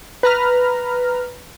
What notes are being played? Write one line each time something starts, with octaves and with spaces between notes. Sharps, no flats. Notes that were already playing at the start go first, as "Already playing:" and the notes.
B4 A#5 F6